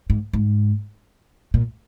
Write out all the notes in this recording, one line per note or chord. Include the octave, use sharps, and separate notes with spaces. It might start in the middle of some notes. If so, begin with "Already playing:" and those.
G#2
G#2
A#2